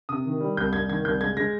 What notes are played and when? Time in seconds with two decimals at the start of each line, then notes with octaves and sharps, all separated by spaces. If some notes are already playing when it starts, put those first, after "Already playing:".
0.09 C3 D#6
0.25 D#3
0.41 G3
0.57 C2 G6
0.73 C2 G#6
0.89 D#3 G#6
1.05 C2 G6
1.21 G#3 G#6
1.37 G#3 A#6